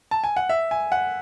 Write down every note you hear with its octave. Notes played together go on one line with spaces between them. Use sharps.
A5
G#5
F#5
E5
G#5
F#5